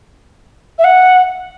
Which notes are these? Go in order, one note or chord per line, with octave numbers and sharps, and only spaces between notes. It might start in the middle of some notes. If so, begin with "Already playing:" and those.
E5
F#5